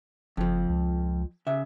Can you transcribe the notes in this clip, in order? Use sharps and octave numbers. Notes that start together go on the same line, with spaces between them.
F#1 F2 F3
C#2
C#3 E5